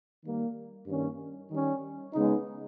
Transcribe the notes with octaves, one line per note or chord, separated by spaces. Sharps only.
D#3 G3 A#3
G2 D#3 A#3 C#4
D#3 G3 C#4
C#3 G#3 B3 D#4